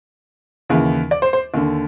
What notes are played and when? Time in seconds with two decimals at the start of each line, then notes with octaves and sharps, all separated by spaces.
0.69 D#2 C#3 E3
1.11 D5
1.22 C5
1.33 C5
1.54 D#2 D3